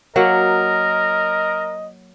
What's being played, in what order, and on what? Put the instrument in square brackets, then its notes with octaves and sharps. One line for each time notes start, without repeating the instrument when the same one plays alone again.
[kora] F#3 A#3 F#5 [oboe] A#4 [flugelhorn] D#5